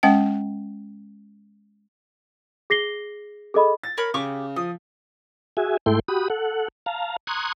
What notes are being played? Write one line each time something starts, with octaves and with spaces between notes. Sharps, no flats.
G#3 C#4 F#5 G5
G#4 A#6 C7 G7
G#4 A4 D#5 B5
A6
A#4 C#5 B5
C#3 G4 C#6 D6
F3 D#6
F#4 G#4 E5 G#5
G#2 A3 E4 A4 G5 C6
F#4 G4 B5 D#6
A4 F#5
F5 A5 A#5
A#5 C6 C#6 D#6 F#6 G#6